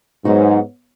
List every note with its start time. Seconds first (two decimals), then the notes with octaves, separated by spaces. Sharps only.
0.25 G#2 F#3 B3 D#4 F#4